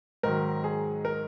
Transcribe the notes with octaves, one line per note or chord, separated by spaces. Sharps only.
G#2 D#3 F#3 A#4
G#4
A#4